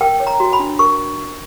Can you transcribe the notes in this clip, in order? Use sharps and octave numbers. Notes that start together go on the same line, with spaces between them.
A#4 G5
C#5
A#5
F#4
B5
D4
A#4 C#6